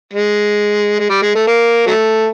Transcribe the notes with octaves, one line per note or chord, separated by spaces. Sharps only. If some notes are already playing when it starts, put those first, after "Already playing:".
G#3
G#3
G3
G#3
A3
A#3
F#3 A3